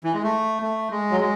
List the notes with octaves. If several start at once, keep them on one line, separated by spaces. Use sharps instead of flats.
E3
G#3
A3
A3
G#3
F#3
G#3